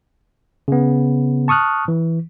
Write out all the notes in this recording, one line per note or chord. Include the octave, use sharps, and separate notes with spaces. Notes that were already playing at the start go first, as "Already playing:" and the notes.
C#3 B3
A5 C#6 D#6 F6 F#6
E3